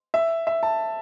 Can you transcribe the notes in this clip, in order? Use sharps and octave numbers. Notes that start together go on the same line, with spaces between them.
E5
E5
A5